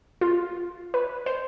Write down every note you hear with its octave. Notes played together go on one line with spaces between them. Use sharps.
F4
B4
C5